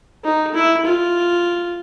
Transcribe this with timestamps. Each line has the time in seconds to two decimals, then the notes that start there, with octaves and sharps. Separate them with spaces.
0.24 D#4
0.54 E4
0.85 F4